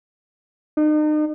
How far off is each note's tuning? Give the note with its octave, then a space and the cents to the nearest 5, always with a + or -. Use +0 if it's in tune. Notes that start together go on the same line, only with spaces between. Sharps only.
D#4 -40